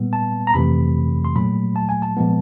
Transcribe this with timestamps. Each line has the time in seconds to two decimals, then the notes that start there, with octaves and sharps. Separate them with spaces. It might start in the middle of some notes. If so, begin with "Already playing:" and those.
Already playing: A#2 G3 B3
0.13 A5
0.47 A#5
0.54 F2 C3 E3 A3 B5
1.25 C6
1.35 A#2 F#3 A3 B5
1.76 A5
1.89 G#5
2.02 A5
2.17 A#2 F3 G#3 B3